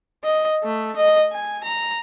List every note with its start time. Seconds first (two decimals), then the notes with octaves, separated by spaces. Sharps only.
0.24 D#5
0.63 A3
0.96 D#5
1.32 G#5
1.64 A#5